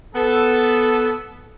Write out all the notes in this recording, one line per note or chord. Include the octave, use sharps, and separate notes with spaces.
B3 A4